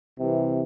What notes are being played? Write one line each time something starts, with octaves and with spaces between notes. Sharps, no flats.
C2 C3 E3